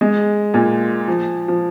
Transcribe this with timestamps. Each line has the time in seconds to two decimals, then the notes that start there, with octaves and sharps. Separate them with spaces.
0.01 G#3
0.54 A#2
1.08 F3
1.48 F3